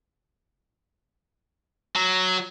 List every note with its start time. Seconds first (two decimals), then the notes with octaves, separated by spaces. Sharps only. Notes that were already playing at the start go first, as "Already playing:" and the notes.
1.96 F#3